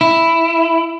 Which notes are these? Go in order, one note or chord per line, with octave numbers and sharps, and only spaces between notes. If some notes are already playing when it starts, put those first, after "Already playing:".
E4